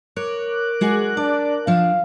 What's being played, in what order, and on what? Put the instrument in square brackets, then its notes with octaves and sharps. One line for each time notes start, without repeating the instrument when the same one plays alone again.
[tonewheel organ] A#4 D6 F#6 [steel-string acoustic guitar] C#5
[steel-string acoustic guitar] G#3 F#4 G#4
[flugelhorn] D4 [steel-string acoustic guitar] D5
[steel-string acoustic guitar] F3 D4 [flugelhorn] F5